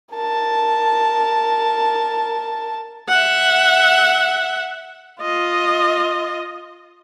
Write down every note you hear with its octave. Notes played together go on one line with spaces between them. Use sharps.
A#4 A5
E5 F#5
F4 D#5